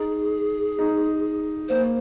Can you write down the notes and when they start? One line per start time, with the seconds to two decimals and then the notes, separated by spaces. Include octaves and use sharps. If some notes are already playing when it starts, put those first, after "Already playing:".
Already playing: D#4 G#4
0.78 D#4
1.69 A#3 C5